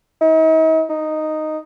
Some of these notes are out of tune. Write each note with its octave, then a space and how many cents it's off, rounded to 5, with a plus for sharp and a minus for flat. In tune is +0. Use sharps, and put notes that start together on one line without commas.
D#4 +45
D#4 -5